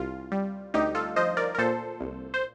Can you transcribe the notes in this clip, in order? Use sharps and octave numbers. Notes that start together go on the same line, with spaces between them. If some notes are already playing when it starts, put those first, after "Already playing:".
Already playing: C2 F4
G3
D2 D#4 G4
F4 A4
F3 C5 D#5
A#4 D5
A#4
A#2 A4 C5
C2
C5